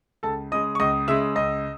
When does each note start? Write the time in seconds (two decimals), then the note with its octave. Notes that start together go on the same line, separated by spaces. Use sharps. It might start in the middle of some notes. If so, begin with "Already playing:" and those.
0.23 C#2 A4 A5
0.52 C#3 G#3 D#5 D#6
0.75 C#6
0.80 C#2 D#5 D#6
1.08 C#3 G#3 E5 E6
1.36 C#2 D#5 D#6